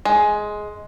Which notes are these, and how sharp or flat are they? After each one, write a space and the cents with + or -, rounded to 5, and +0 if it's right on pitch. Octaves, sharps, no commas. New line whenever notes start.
G#3 +10